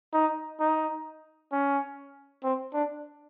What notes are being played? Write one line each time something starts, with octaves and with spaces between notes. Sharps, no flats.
D#4
D#4
C#4
C4
D4